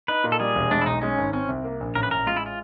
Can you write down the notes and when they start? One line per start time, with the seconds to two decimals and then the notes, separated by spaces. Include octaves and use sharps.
0.08 D#4 B4
0.24 A#2
0.32 A4
0.40 G3 G#4
0.55 E1
0.71 G#3 D4
0.81 E4
0.86 B1 D#4
1.02 G#3 C#4
1.18 G#1
1.33 C4 C#4
1.49 C2
1.64 A#3
1.80 A#1
1.95 A1 A#4
2.03 B4
2.11 A1 A#4
2.26 G#3 F4
2.37 E4
2.46 F4